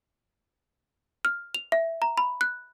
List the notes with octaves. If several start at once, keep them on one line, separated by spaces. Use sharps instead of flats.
F6
F7
E5
A#5
B5
F#6